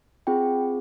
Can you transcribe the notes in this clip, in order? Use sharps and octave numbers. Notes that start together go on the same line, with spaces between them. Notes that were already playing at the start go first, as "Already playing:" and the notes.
C4 F4 G#4 G5